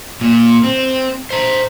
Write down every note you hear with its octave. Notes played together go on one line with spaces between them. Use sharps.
A#2
C4
C5 A#5